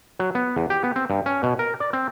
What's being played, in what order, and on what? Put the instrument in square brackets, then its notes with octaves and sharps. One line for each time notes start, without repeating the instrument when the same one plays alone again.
[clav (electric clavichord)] F#3
B3
E2
G4
B3
C4
G2
C#4
B2
A#4
D5
C4